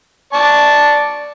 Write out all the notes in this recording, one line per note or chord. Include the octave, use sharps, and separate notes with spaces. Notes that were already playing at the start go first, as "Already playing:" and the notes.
D5 A5 C#6